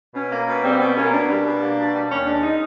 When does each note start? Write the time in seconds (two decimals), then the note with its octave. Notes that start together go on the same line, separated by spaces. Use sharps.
0.14 B2 C#4
0.31 A#3
0.47 B2
0.63 G3 C4
0.79 B2 B3
0.96 A#3 C#4
1.12 B2 D4
1.28 G3
1.45 B2
1.61 A#3
1.78 B2
1.93 G3
2.10 D#2 C#4
2.26 G#3 D4
2.43 D#4